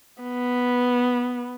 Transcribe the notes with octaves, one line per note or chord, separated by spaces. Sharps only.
B3